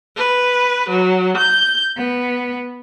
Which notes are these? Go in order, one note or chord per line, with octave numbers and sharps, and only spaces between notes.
B4
F#3
G6
B3